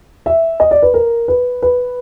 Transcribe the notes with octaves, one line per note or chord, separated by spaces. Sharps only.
E5
D#5
D5
B4
A#4
B4
B4